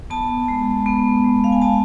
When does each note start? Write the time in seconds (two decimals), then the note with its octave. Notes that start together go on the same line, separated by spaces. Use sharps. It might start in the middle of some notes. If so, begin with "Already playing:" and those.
0.10 B3 A5
0.48 G#3
0.86 B3
1.24 G#3
1.44 F5
1.52 G#5
1.62 B3 A5